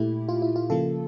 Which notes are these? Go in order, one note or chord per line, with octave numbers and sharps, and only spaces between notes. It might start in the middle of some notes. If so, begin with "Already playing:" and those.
Already playing: A#2 A3 E4 G4
F4
E4
F4
C#3 F3 A#3 F4 A4